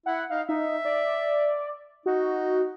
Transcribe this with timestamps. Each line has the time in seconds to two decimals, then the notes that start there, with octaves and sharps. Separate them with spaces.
0.06 E4 F#5
0.30 D#4 F5
0.49 D#4 E5
0.85 D5
2.06 D#4 F#4